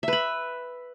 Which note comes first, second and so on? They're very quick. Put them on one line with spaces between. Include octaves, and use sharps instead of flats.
E5 B4 B5